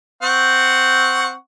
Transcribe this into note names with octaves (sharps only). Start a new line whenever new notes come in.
C4 F#5 C#6